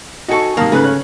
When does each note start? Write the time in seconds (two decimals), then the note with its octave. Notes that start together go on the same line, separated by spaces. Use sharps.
0.28 D#4 F#4 A4 G#5 C#6
0.57 C3 D#3 A#3 A5 D#6 F6
0.72 G#2 C#3 A3 B4 F#6
0.84 C#5 F#6